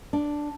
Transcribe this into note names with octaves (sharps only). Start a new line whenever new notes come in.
D4